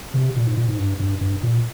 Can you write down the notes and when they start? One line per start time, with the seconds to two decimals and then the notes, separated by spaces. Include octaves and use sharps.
0.14 C3
0.36 A#2
0.46 G#2
0.57 A#2
0.68 G#2
0.78 G2
1.00 G2
1.21 G2
1.43 A#2